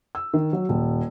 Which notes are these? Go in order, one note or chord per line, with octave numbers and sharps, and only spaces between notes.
E6
D#3
F#3
D#1